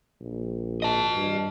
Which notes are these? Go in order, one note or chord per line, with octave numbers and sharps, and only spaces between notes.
A#1
D#5 A5
G2